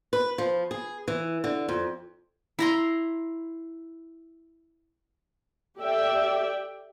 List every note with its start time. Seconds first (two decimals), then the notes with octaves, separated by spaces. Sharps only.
0.13 B4
0.38 F3
0.71 G#4
1.08 E3
1.44 D3
1.69 F2
2.59 E4 A#5 C6
5.79 G4 A4 D5 E5 G5